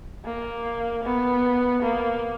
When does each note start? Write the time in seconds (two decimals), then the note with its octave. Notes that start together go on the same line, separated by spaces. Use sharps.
0.25 A#3
1.04 B3
1.82 A#3